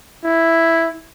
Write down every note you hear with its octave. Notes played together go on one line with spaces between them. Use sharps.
E4